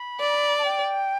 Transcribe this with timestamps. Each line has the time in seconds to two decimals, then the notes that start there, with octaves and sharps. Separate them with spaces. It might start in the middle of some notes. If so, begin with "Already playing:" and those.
Already playing: B5
0.20 D5
0.59 A5
0.64 G5